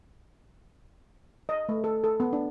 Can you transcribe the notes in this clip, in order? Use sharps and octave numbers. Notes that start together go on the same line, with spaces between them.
D#5
A3
A4
A4
B3
D4